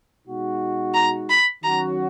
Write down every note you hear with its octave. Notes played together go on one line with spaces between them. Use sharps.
B2 G#3 D#4 F#4
A#5
B5
D#3 F#3 C#4 F#4 A#5